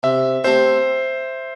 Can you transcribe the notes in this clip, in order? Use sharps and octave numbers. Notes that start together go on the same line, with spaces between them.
C3 E5
A3 C4 G4 C5 E5